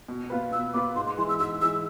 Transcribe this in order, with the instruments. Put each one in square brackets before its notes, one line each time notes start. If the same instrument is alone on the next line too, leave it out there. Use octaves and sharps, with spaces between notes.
[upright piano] B2
B3 F4 B4
[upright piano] B2 [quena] E6
[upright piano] B3 F4 B4 [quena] D6
[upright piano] G#2 [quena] C6
[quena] C6
[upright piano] E3 G#3 [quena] C6
[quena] E6
[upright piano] G#2 [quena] E6
[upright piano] E3 G#3 [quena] E6